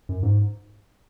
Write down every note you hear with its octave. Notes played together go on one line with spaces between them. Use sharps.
F#2
G#2